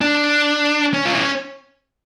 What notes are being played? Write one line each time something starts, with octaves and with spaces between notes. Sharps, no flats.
D4
C#4
F4
E4